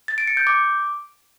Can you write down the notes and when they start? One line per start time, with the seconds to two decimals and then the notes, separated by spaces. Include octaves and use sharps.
0.08 A6
0.18 D7
0.27 C#7
0.37 G6
0.47 D6